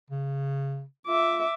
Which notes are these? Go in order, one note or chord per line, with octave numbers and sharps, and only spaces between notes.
C#3
F4 E5 D6